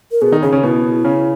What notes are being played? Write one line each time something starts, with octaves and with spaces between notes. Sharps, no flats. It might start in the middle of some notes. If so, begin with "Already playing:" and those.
A#4
B2 B3 G#4
D#3 D#4
C#3 C#4 G#4
C#3 C#4
B2 B3 E4
C#3 C#4